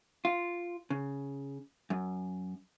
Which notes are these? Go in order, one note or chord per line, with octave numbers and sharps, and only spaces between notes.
F4
C#3
F#2